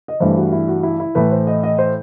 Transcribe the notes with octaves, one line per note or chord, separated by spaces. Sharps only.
D#5
G2 E3 A3 C5
F#4
E4
F#4
E4
E4
A2 E3 A3 B4
C5
D#5
D#5
C5